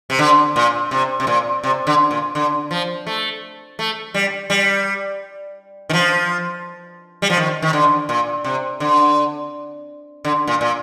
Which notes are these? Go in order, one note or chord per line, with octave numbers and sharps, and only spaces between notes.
C3
D3
A#2
C3
C3
A#2
C3
D3
A#2
D3
F3
A3
A3
G3
G3
D#3
F3
G3
F3
D#3
D#3
D3
A#2
C3
D3
D3
A#2
A#2